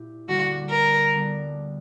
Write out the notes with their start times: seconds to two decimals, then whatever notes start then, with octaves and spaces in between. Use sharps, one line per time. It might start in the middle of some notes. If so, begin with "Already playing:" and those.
Already playing: A#2 E4 G4
0.27 D2 D3 G3 A#3 D4 F#4
0.71 A#4
1.14 D3 G3 B3 D4